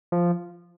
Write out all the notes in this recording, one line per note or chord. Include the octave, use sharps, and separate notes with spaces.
F3